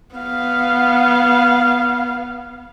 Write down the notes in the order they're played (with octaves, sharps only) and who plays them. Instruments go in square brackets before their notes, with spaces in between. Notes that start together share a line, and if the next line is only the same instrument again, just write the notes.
[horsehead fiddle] B3 F5